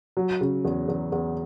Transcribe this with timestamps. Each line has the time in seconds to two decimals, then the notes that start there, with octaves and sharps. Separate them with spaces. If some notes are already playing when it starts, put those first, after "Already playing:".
0.17 F#3
0.41 C#3
0.65 E2
0.88 E2
1.12 E2